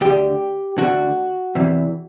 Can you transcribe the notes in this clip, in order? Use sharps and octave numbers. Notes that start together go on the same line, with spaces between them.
D2 D3 G4
D2 D3 F#4
E2 C3 E3